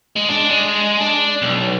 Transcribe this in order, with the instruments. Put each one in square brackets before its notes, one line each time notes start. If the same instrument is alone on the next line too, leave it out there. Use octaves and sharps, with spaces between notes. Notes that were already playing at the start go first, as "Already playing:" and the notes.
[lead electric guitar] G#3
D4
G#3
D4
B1